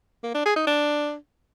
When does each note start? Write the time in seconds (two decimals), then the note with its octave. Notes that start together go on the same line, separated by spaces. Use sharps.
0.24 A#3
0.35 D4
0.45 G#4
0.56 D#4
0.67 D4